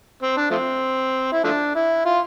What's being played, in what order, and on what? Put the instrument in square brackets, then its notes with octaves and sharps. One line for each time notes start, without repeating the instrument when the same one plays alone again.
[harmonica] C4
D4
F3 A3 C4
E4
F3 A3 D4
E4
F4